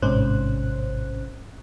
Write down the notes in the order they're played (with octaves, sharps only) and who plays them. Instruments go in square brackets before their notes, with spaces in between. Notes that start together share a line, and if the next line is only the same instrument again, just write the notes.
[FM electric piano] A1 G#2 C3 C#4 C5 F#6